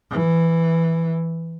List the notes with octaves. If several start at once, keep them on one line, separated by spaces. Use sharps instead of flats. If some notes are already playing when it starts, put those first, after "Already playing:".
E3